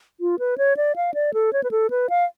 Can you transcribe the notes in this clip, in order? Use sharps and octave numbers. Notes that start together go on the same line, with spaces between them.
F4
B4
C#5
D5
F5
D5
A4
C#5
B4
A4
B4
F5